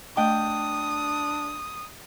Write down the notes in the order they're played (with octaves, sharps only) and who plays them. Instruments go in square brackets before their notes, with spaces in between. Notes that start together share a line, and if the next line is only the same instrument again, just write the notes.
[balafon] A3 D#5 [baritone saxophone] D4 [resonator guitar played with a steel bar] G5 [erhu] D#6